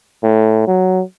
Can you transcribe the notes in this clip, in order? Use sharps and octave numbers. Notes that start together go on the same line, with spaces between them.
A2
F#3